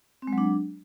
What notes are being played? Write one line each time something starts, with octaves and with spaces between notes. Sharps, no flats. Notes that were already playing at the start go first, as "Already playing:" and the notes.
C4
G#3
F#3
D4